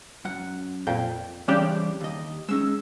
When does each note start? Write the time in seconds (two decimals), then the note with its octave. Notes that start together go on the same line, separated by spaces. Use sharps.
0.25 F#2 F#5
0.87 F2 A#2 G5
1.48 C#3 E3 G3 C4 D4 G4
2.01 D#2 D#5
2.49 G#3 C#4 D#4 E6